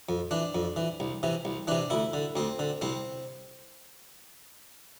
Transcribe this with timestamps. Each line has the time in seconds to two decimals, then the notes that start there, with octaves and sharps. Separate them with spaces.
0.09 F2
0.31 E3 D4
0.55 F2
0.76 E3
1.00 C2
1.23 C3 E3
1.45 C2
1.68 C3 E3 D4
1.90 D2 E4
2.14 D3
2.36 D2 C4
2.59 D3
2.81 C2 C4